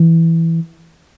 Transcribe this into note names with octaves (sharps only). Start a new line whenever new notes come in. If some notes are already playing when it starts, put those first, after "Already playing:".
Already playing: E3